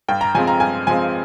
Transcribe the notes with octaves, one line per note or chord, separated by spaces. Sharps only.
G2 G5
A#5
F3 G#3 C4 G#5
A#5
G2 G#5
F3 G#3 C4 G#5